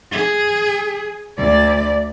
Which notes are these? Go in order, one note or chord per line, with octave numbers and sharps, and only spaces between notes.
G#4
D2 D5